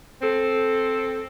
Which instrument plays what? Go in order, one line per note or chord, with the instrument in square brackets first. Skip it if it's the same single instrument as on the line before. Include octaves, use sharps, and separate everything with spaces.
[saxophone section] C4 A4